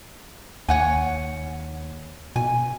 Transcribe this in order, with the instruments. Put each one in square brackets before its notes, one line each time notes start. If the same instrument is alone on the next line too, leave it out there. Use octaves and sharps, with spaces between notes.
[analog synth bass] D#2 [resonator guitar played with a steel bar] C#5 F#5 G#5
[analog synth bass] B2 [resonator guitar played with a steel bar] G#5